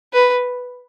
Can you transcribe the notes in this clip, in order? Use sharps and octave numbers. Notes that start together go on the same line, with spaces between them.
B4